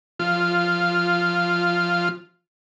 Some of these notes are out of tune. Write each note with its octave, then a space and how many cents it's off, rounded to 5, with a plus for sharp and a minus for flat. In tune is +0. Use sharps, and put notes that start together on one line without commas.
F3 +0 F4 -10